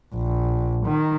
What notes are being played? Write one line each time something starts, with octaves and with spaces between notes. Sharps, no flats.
A#1
D#3